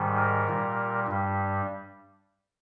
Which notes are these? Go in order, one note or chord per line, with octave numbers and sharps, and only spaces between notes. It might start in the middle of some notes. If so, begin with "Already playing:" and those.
Already playing: G#2 D#3 G3
A#4
A#2 G3
G2 G3